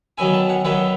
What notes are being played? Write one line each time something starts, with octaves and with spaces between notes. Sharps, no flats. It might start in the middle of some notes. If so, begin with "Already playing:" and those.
D#3 F#3 B3 E4 G#5
A5
F#5
D#3 F#3 B3 E4 F#5